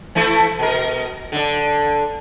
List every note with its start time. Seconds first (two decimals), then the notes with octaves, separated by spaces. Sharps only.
0.15 E3 A3 E4
0.59 B2 A#4
1.32 D3 D4